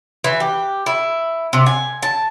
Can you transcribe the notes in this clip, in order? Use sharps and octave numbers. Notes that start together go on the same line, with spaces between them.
E3
G4
E4
C3
G#5
A5